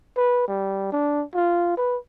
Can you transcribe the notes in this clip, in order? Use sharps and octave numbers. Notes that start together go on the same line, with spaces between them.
B4
G3
D4
F4
B4